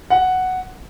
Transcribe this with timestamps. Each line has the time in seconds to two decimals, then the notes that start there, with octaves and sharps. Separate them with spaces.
0.10 F#5